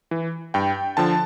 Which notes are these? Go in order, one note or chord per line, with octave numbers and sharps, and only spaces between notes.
E3
G2 G5
D3 F3 A5